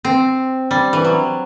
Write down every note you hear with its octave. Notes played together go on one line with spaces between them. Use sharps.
C4
G3
E3
F#3